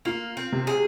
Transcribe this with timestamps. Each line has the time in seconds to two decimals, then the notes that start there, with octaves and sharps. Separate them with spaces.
0.05 A#3 F4
0.37 C4
0.52 C3
0.67 G#4